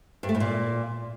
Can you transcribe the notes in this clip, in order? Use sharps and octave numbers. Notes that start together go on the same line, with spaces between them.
G2
A3
A2
A#2